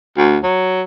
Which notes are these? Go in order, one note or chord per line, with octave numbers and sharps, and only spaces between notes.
D2
F#3